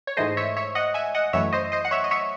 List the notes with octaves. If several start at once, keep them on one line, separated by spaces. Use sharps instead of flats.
C#5
G#2 E3 A3 C5 D#5
C#5 E5
C#5 E5
D#5 F#5
E5 G#5
D#5 F#5
F#2 E3 A3 C#5 E5
C5 D#5
C5 D#5
F#5
C#5 E5
D#5
C#5 E5